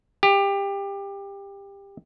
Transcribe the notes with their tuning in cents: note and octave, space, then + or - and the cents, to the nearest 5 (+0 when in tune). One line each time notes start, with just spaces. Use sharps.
G4 +20